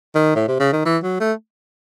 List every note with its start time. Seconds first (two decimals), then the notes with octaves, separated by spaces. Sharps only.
0.15 D#3
0.36 A2
0.48 C3
0.60 C#3
0.73 D#3
0.85 E3
1.03 F#3
1.20 A3